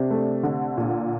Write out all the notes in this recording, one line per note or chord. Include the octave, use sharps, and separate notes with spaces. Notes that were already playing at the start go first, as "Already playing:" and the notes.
Already playing: C3 D4
A3
D3
A#2